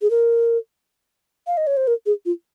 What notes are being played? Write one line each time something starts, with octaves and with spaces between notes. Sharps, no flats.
G#4
A#4
F5
D#5
C#5
C5
A#4
G#4
F4